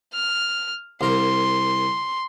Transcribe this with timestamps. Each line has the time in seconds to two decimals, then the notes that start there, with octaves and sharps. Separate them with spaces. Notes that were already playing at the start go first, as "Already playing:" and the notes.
0.13 F6
1.01 C2 A#4 C6